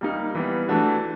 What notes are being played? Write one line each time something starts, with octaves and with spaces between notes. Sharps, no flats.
G3 A#3 D#4
E3 G3 B3
E3 A3 D4 F#4